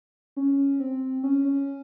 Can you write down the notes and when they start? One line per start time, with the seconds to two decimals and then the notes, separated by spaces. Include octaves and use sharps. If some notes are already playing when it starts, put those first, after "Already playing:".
0.37 C#4
0.80 C4
1.23 C#4
1.45 C#4